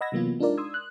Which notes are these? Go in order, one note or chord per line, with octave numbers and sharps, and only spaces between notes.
D#5 F#5 B5 E6 G#6 A#6
C3 E3 F#3 A#3 B3 F4
G#3 D4 D#4 F4 A#4 D5
C6 D#6 E6 G#6
F#6